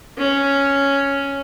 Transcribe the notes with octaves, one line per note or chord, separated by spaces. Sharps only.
C#4